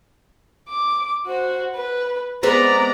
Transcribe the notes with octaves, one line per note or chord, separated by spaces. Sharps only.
D6
F#4 C5
B4
G#3 B3 C4 D5 A#5